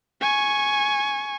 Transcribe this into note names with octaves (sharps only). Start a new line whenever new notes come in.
G#5 C#6